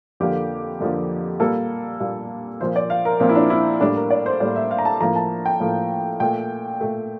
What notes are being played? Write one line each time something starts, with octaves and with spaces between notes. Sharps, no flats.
F2 D3 F3 A#3 G4
F2 D3 F3 A#3
A#2 G3 A#3 A4
A#2 G3 A#3
A#2 F3 A#3 C5
D5
F5
A#4
A#2 F3 A#3 C4
E4
D4
E4
A2 G3 A#3 D4
A#4
D5
C5
A2 G3 A#3 D5
E5
F5
A#5
A5
A2 F3 A#3 A#5
A5
G5
A2 F3 A#3
A#2 A3 G5
A#2 A3